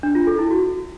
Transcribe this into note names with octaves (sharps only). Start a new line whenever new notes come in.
D4
F4
A4
E4
F#4